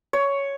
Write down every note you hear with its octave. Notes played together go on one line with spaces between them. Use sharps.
C#5